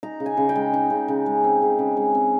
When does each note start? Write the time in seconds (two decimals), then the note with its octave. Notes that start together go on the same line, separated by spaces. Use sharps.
0.03 D#4 A#5
0.20 C#3
0.26 G#5
0.37 C#3
0.49 G5
0.55 G#3
0.74 D#4
0.90 C#3
1.08 C#3
1.26 G#3
1.44 C4
1.62 C#3
1.79 C#3
1.97 G#3
2.15 C4